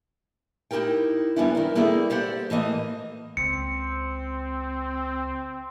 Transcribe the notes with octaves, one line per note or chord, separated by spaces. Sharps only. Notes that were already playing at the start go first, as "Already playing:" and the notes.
D#4 E4 G4 A#4 G5
F#2 G3 B3 C#4 D4 E4
D#3 E4 A#4
G3 A#3 B3 E4 G#4 A4
G4 C5 D5 F#5
A2 E3 A#3 D#5
C#2 C4 C#7